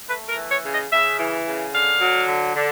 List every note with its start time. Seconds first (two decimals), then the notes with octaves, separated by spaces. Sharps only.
0.09 A3 B4
0.29 A#4
0.36 E3
0.50 C#5
0.64 C#3
0.71 D#5
0.91 C#3 E5
1.18 E3
1.46 C#3
1.73 D3 F5
2.01 F#3
2.28 D3
2.55 D3